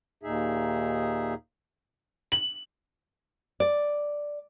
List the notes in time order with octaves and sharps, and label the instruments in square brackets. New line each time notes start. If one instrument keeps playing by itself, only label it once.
[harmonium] D#2 A#2 D#4 G#4 E5
[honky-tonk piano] F#7
[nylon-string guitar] D5